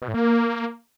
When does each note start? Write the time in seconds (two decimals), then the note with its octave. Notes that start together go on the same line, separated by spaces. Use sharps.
0.02 B2
0.08 A2
0.14 A#3